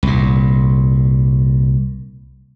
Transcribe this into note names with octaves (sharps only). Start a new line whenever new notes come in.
C2 A#2